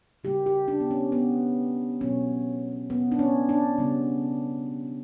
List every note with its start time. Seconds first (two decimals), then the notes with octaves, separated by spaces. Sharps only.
0.24 C#3 G3 A#3 G4
0.46 G4
0.68 D4
0.80 B3
0.91 C#4
1.12 B3
2.01 B2 F#3 B3 C#4
2.90 B3
3.12 D4
3.19 C#4
3.49 D4
3.78 C#3 G3 B3